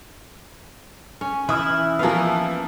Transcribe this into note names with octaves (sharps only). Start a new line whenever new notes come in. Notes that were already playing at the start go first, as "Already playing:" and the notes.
C#4
E3 E4 D#6 F6
F3 A#3 B3 C#4 F5